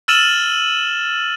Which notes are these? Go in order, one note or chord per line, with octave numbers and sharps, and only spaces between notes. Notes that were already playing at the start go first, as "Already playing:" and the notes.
E6 F6 A6 D#7 E7 F#7